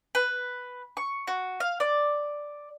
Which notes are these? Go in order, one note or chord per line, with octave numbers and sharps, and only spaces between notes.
B4
C#6
F#4
F5
D5